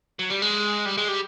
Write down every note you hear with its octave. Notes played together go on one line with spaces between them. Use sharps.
F#3
G3
G#3
G3
G#3
G3